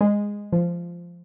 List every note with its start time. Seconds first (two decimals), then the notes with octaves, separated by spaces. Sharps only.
0.01 G#3
0.53 F3